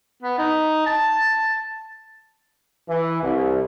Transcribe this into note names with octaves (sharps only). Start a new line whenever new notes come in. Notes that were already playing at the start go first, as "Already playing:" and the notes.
B3
D#4
A5
E3
C2